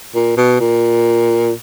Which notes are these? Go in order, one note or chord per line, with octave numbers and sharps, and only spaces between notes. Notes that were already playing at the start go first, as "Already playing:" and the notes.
A#2
B2
A#2